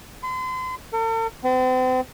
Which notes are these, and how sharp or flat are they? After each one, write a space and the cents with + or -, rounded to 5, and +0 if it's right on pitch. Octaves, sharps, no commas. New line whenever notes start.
C6 -40
A4 +45
C4 -40